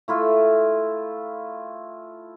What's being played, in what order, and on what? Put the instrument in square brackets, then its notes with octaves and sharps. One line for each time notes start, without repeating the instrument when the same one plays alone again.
[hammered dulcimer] A3 E4 F4